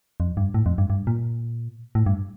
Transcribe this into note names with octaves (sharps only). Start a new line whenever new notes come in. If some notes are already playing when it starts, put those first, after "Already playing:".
F2
G2
A2
F2
G2
G2
A#2
A2
G2